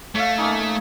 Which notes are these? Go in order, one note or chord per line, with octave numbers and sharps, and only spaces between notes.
A3 C#5 E5 F5
A#3 C#4 D#4